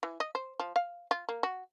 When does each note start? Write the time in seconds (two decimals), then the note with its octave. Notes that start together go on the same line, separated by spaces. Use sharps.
0.03 E3
0.20 D#5
0.35 C5
0.60 F3
0.76 F5
1.11 F4
1.29 A#3
1.43 F#4